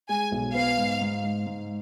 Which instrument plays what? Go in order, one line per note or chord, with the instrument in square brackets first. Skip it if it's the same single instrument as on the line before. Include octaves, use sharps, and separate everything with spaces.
[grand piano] G#3 [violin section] G#5
[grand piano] B1
[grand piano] B3 [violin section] F5
[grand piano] G#2
G#2
G#2
G#2